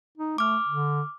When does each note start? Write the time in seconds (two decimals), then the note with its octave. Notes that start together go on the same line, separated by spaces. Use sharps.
0.18 D#4
0.38 A3 D6 F6
0.69 D3